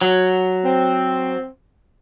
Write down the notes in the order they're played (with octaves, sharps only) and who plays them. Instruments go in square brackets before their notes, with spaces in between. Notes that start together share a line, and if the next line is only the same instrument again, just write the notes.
[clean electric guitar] F#3
[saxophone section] C4